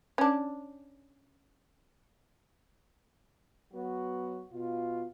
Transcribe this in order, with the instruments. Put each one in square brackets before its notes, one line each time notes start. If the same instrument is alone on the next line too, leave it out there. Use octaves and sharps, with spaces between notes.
[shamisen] C#4 D4
[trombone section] F#3 B3 F#4
B2 F4